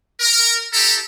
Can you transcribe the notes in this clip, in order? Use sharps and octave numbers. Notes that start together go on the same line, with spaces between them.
A#4
E4 G4 A4 A#5